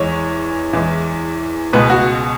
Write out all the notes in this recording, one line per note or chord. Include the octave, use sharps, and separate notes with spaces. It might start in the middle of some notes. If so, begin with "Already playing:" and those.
Already playing: E2 E3 G#3 C#5
E2 E3 G#3
C#2 B2 G#3 B4
F#4